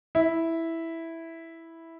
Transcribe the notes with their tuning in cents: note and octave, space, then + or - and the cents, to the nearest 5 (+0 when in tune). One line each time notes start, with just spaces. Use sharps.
E4 -5